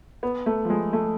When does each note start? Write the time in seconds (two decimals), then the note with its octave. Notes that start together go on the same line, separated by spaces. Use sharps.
0.23 B3
0.46 A3
0.65 F3
0.70 G#3
0.93 A3